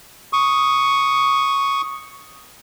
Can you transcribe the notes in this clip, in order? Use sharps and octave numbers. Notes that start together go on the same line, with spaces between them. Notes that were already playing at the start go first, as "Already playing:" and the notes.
C#6 D#6